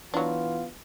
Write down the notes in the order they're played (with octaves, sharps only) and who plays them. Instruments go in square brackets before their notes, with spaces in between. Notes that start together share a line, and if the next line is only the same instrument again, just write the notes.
[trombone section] E3 B3 F4 [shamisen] F#3 D4